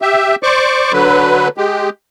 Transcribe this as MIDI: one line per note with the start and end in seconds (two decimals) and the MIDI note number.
0.02 0.36 67
0.02 0.36 76
0.43 0.92 72
0.43 0.92 74
0.43 0.92 85
0.43 0.92 86
0.93 1.48 50
0.93 1.48 54
0.93 1.48 71
1.58 1.89 56
1.58 1.89 67